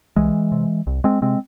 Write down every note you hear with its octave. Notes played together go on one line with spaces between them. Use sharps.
C2 E3 G#3
C3
C2
G#3 C4
C3 G#3 C4